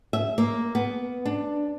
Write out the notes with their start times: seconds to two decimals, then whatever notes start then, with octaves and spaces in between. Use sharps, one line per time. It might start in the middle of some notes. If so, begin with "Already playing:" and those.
0.13 E5
0.38 A#3
0.75 B3
1.26 D4